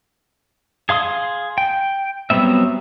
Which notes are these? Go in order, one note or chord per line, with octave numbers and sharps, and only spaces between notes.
G#4 F5 C6 D#6
G5
F#3 G3 B3 C4 E5